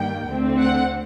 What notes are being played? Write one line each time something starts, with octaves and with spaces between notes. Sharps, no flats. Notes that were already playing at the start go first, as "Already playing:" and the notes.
Already playing: G2 D#3 G3 A#3 G5
D2 D3 A3 C4
F#5